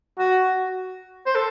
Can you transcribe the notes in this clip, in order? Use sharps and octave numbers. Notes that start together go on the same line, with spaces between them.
F#4
C5
A4